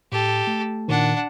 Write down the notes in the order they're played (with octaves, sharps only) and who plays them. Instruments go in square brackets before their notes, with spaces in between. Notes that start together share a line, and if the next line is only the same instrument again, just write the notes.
[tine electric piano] A2 [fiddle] G4 A4
[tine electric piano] A3
[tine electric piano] A#2 D#3 [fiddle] D4 F#5